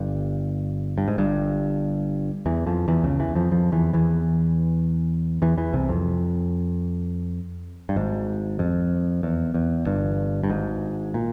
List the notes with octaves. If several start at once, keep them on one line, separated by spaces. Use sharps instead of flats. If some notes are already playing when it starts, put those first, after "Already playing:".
Already playing: G1 G2
G2
G#2
G1 G2
E2 E3
F2 F3
E2 E3
C#2 C#3
E2 E3
F2 F3
F2 F3
E2 E3
E2 E3
E2 E3
E2 E3
C2 C3
F2
G2
G#1 G#2
F2
E2
E2
G1 G2
G2
G#1 G#2
A#2